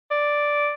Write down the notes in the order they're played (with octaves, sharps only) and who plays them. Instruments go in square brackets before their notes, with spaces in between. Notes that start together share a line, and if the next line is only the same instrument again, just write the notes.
[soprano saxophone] D5